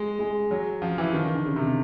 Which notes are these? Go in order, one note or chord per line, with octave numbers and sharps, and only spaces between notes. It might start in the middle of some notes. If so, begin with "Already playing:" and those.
Already playing: G#3
G#3
F#3
F3
E3
D#3
D#3
D3
C#3
C3